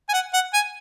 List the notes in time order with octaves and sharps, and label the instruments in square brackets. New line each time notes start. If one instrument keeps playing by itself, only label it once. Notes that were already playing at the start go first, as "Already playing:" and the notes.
[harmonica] G#5
F#5
F#5
G#5